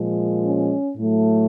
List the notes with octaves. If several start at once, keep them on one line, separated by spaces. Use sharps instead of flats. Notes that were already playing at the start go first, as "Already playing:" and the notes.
Already playing: A#2 F3 G#3
C#4
A2 F#3 A3